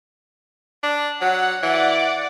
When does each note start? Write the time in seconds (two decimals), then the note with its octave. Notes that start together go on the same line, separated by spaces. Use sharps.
0.83 D4
1.21 F#3 F#5
1.63 E3 D5 F#5